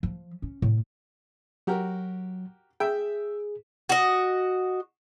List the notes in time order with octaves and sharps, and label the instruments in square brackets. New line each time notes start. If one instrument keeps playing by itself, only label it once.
[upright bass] F3
C#4
A2
[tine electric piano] F#3 [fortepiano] F#4 G4 A#4
[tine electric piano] G#4 [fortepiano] E5 G5
[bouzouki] F#4 D#5